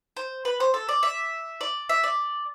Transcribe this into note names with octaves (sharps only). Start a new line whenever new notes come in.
C5
B4
C5
A4
D5
E5
D5
E5
D5